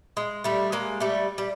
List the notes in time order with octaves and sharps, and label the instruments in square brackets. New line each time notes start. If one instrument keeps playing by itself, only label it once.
[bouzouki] G#3
G3 A3
G#3 A#3
G3 A3
G3